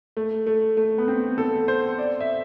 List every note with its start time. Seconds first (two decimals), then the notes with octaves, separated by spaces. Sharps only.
0.17 A3
0.47 A3
0.77 A3
0.98 B3
1.08 C4
1.38 A4
1.68 C5
1.98 D5
2.20 E5